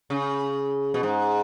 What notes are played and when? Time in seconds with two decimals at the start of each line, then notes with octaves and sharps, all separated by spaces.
0.10 C#3
0.94 B2
1.03 G#2